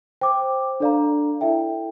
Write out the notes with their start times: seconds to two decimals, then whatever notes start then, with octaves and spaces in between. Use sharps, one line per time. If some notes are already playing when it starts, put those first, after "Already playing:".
0.21 C5 G5 D6
0.80 D4 A4 D5 F5 A#5
1.41 E4 A4 E5 G5